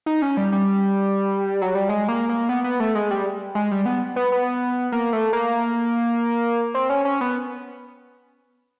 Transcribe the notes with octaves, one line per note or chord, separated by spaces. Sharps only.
D#4
C#4
G3
G3
F#3
G3
G#3
A#3
A#3
B3
B3
A3
G#3
G3
G#3
G3
B3
B3
B3
A#3
A3
A#3
C4
C#4
C#4
B3